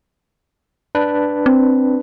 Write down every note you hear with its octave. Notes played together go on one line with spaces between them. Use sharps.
D4 B4
C4